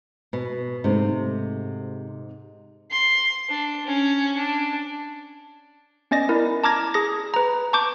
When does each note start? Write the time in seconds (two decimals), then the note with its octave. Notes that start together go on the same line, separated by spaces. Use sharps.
0.33 B2
0.84 G#2 C3 A3
2.91 C6
3.49 D4
3.85 C#4
4.37 D4
6.11 B3 C#4 D5 D#5 A#6
6.29 E4 A#4
6.64 A5 A#5 D6 F6 G#6 A#6
6.94 G#4 A#6
7.34 B4 A#5
7.73 A5 C#6 D6 G6